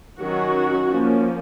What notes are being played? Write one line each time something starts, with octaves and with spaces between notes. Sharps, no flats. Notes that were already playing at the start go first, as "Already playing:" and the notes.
D#3 F#3 C#4 F#4
F3 A#3 C#4